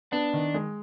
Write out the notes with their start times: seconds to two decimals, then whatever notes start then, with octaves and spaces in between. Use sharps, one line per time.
0.12 B3 D4
0.33 D#3
0.54 G#3